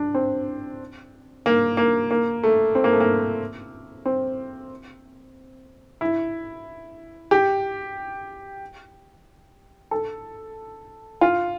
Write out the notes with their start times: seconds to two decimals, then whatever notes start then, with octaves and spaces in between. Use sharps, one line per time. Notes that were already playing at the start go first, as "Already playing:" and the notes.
Already playing: D4
0.15 C4
1.46 A#3
1.77 A#3
2.11 A#3
2.44 A3
2.75 C4
2.84 A#3
2.93 A3
3.00 A#3
4.06 C4
6.01 E4
7.31 G4
9.91 A4
11.21 F4